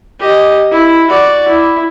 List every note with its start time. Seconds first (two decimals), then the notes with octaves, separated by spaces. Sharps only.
0.19 G4 D#5
0.71 E4
1.09 F#4 D5
1.48 E4